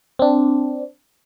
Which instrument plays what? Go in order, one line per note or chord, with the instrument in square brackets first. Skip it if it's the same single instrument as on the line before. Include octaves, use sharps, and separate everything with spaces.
[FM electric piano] C4 D4